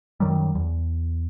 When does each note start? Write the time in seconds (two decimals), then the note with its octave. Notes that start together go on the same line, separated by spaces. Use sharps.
0.20 F#2 D#3 F#3 G3
0.55 E2